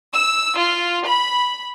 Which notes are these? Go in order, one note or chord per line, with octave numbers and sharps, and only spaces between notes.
E6
F4
B5